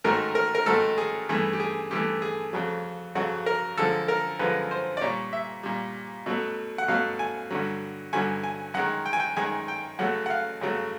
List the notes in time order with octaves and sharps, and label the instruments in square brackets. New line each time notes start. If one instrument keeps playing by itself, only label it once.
[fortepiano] G#2 D#3 F#3 A3 A#4
A#4
A#4
G#2 D#3 F#3 A3 A4
G#4
G2 E3 A3 G#4
G4
G#4
G2 E3 A3 G4
G#4
F2 C#3 F#3
F2 C#3 F#3 F#4
A#4
F#2 D3 F3 G#3 A4
A#4
F#2 D3 F3 G#3 B4
C5
D5
A#2 G3 C#5
E5
A#2 G3
B2 F#3 A3
F#5
B2 F#3 A3 F5
G#5
G2 D3 F#3
G2 D3 F#3 G#5
G#5
F#2 D#3 G#3 F#5
G5
G#5
G5
F#2 D#3 G#3 G#5
G5
F#2 C#3 F#3 A3 F#5
F#5
F5
F#2 C#3 F#3 A3